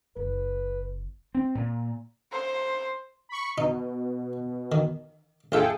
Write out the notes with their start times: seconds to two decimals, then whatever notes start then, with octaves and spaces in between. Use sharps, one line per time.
0.16 F#1 B4
1.35 C4
1.55 A#2
2.32 C5
3.29 B5 C#6
3.58 B2 D#4
4.72 D#3
5.52 A#1 F4 G#4 A4 E5 G5